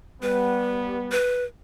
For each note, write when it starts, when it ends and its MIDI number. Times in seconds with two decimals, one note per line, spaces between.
0.23 1.14 55
0.23 1.14 59
0.23 0.96 71
1.12 1.44 71